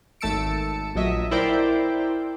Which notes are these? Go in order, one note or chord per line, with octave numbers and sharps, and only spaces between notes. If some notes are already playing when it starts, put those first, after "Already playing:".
G#1 A3 A5 E6 C#7 D7
A#1 F#3 D#5 E5
E4 A#4 C5 D5 G5